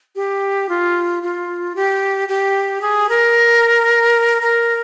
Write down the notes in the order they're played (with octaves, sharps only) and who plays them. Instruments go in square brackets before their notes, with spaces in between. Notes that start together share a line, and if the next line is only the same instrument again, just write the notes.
[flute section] G4
F4
F4
G4
G4
G#4
A#4
A#4